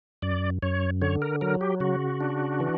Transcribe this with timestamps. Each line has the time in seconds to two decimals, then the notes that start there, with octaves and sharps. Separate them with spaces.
0.22 F#2 D5
0.62 F#2 C#5
1.02 D3 C#5
1.22 A#4
1.41 F#3 A#4
1.61 G4
1.80 C#3 F#4
2.21 D4
2.60 E3